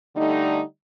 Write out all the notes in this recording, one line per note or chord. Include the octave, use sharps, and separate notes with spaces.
D3 G3 A3 D#4